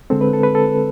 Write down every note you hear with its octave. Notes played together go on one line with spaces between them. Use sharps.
D3 G#3 C4 A4
B4
A4
B4
A4